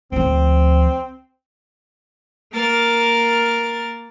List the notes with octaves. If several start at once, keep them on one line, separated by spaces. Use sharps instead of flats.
D2 F3 C4
A#3 A#4 A6